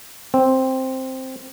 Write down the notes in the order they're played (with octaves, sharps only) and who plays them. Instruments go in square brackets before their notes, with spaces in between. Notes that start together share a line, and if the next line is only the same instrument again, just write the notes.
[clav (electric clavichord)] C4